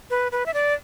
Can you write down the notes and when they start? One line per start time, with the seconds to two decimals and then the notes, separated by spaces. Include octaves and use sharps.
0.10 B4
0.32 B4
0.46 E5
0.54 D5